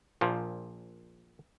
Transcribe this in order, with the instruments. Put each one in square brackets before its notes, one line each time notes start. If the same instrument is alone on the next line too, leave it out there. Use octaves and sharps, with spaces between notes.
[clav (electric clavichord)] A#1 A#2 F3